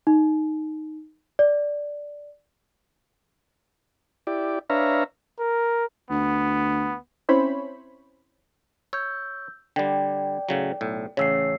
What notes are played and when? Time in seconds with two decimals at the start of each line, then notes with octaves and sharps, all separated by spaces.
0.07 D#4
1.39 D5
4.27 E4 G4 D5
4.70 D4 B4 C#5 E5 F5 A#5
5.40 A#4
6.11 D2 B3
7.29 C4 C#4 E4 C5 C#5 B5
8.93 C#5 E6 G6
9.76 D3 G3 D5 G5
10.49 A2 C#3 F#3
10.81 B1 A2
11.17 A1 C#3 C#5 E6 C7